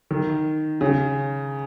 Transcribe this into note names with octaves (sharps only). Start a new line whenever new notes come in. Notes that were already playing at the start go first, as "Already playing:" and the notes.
D#3
C#3